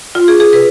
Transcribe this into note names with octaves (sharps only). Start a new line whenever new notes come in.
F4
G#4
G#4
C3 B4